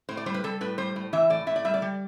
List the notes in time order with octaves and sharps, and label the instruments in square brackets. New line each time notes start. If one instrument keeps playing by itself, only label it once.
[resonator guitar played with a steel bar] A2 C5
D5
G3 C5
B4
G3 A4
A2 B4
G3 C5
A2
E3 E5
A2 D5
A2 E5
D5
G3 E5
D5
G3